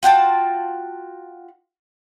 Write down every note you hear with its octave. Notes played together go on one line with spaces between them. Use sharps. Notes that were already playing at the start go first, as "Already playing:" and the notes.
F4 F#4 G5 A5